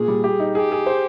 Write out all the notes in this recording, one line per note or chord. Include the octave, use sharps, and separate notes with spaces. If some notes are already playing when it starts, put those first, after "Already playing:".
Already playing: A#2 G#4
G3
G4
D#4
G4 G#4
G#4
C5